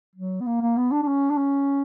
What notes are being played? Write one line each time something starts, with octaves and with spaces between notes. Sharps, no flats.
F#3
B3
A#3
A#3
B3
D4
D4
C#4
D4
C#4